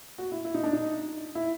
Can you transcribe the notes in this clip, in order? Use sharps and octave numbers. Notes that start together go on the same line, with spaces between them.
F#4
E4
E4
D#4
D4
D#4
E4